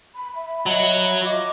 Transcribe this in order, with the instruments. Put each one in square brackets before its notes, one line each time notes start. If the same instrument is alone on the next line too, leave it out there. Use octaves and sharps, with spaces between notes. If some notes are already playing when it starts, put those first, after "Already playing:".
[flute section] B5
E5 B5
[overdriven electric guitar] F#3 [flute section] D#5 E5 B5
[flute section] F4 D#5 D6